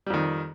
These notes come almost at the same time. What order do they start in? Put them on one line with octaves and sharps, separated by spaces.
G3 F2 D#3